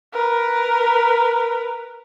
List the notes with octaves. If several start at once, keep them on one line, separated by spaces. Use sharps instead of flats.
A#4 B4